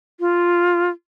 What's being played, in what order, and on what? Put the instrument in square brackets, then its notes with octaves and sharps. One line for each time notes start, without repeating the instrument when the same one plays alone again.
[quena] F4